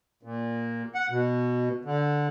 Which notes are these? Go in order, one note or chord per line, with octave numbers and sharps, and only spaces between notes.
A#2
F#5
B2
D3